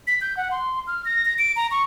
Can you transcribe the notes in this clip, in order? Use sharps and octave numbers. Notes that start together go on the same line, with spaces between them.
B6
G6
F#5
C6
F6
A#6
A#6
D7
A#5
C#6